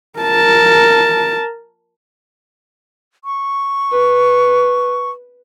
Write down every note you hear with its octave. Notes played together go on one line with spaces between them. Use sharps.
A#4 A5
C#6
B4